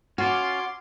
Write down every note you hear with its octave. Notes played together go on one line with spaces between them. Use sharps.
C#4 F4 F#4 C6 D6